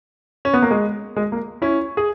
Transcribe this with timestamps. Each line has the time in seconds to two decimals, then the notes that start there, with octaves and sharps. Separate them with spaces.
0.45 C#4
0.54 B3
0.62 A#3
0.71 G#3
1.16 G#3
1.32 A#3
1.62 C#4 E4
1.97 G#4